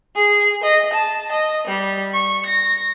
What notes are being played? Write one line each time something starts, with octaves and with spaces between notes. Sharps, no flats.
G#4
D#5
A5
D#5
G3
C#6
A#6